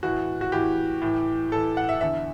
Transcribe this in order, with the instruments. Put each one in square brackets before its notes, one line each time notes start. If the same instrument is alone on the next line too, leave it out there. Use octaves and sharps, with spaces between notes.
[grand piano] A2 E3 F#4
F#4
A2 E3 G4
A2 E3
A2 E3 A4
F#5
E5
E2 D3 E5